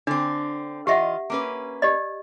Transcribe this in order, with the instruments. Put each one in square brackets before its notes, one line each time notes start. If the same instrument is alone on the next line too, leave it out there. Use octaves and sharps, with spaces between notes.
[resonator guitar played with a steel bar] D3 C4 [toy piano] D4
[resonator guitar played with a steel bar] E3 F4 D#5 [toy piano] G4 E5 F#5
[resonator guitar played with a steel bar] A#3 C#4 B4
[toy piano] G4 D5 D#5